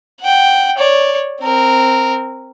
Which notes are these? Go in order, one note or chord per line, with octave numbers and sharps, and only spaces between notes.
F#5 G5
C#5 D5
C4 A#4